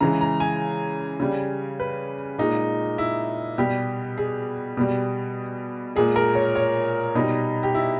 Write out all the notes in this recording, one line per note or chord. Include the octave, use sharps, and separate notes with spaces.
C#3 E3 G#3 A#5
A#5
G#5
C#3 G3
B4
A#2 G#3 D#4
E4
B2 G3 G4
G#4
B2 G3
A#2 G#3 G#4
A#4
C#5
C#5
B2 G3 D#4
G4
E4